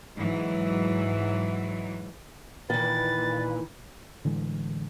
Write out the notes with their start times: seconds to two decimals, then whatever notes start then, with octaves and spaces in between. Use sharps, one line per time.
0.16 G#2 E3 F#3
2.70 A#2 D#3 E3 B4 A6
4.25 A2 D3 E3 G#3